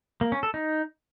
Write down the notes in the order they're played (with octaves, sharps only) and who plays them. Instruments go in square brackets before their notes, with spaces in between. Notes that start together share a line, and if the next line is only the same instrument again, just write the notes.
[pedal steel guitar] A#3
C#4
A4
D#4